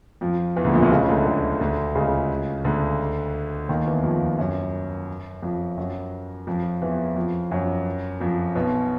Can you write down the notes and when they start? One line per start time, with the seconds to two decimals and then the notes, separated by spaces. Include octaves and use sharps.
0.21 F2 F3
0.56 E2 E3
0.65 D2 D3
0.73 A#1 A#2
0.82 C2 C3
0.91 C#2 C#3
1.09 D2 D3
1.25 D2 D3
1.60 D2 D3
1.95 C#2 C#3
2.64 D2 D3
3.69 D#2 D#3
3.86 E2 E3
4.03 F2 F3
4.38 F#2 F#3
5.43 F2 F3
5.77 F#2 F#3
6.47 F2 F3
6.82 E2 E3
7.16 F2 F3
7.51 F#2 F#3
8.20 F2 F3
8.55 B1 B2